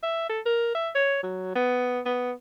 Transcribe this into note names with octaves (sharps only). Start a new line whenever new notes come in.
E5
A4
A#4
E5
C#5
F#3
B3
B3